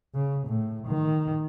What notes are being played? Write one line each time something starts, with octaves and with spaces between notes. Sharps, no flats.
C#3
A2
D#3